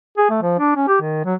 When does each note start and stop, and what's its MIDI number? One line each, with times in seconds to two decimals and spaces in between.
0.17 0.28 68
0.30 0.38 57
0.42 0.54 53
0.59 0.76 62
0.76 0.87 61
0.88 0.97 67
1.01 1.21 51
1.25 1.35 54